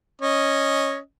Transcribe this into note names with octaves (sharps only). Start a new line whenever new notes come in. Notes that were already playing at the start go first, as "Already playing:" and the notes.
C#4 D#5